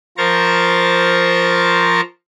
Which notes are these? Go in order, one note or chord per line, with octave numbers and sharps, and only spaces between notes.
F3 A#4 C5 A#5 C#6 A6